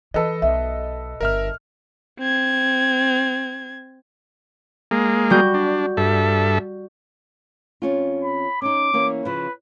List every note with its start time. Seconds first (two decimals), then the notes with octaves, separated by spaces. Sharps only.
0.14 E3 A4 B4 D#5
0.42 B1 E5
1.21 G1 A#4 E5 F6
2.19 C4 G#6
4.91 G#3 A#3
5.30 G3 F#4 G6
5.54 D4
5.97 G2 A4 E5
7.82 F2 C#4 F4
8.23 B5
8.62 C#4 D#4 D6
8.93 E3 A#3 C#4
9.25 C#3 F3 B4